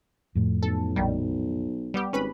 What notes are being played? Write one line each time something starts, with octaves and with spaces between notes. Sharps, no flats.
F2 A2
B1 A4
A#1 D#3 G3
G3 B3 G4
G#1 C#4 B4 B5